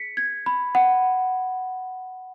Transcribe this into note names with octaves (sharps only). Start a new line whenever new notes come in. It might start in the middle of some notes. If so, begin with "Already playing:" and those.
Already playing: G#4 B6 C#7
G#6
B5
F#5